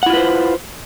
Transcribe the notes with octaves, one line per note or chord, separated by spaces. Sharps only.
E4 F4 B4 C5 F#5